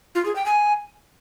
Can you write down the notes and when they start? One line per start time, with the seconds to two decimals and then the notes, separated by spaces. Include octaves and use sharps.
0.15 F4
0.25 G#4
0.36 G5
0.46 G#5